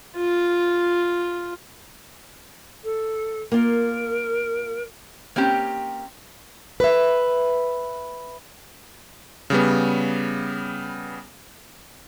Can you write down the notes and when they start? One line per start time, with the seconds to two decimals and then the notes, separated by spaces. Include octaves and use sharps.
0.17 F4
2.84 A4
3.52 A#3 F4 A#4
5.36 A#3 C4 C#4 G4 G5
6.80 B4 E5
9.50 C#3 G3 B3